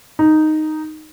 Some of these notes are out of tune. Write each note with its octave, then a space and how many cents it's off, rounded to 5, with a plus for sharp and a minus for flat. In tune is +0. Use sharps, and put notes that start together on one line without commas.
D#4 -5